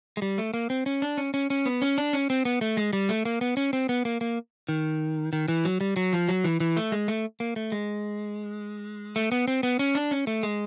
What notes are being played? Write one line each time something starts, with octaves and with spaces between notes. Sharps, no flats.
G#3
G3
A3
A#3
C4
C#4
D4
C#4
C#4
C#4
B3
C#4
D4
C#4
C4
B3
A3
G#3
G3
A3
A#3
B3
C#4
C4
B3
A#3
A#3
D#3
D#3
E3
F#3
G3
F#3
F3
F#3
E3
E3
A3
G#3
A3
A#3
A3
G#3
A3
B3
C4
B3
C#4
D4
C#4
A3
G#3